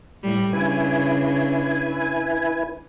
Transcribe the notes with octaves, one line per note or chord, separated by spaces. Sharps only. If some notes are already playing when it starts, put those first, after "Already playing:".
A2 G3
C#3 D4 E4 B4 G#5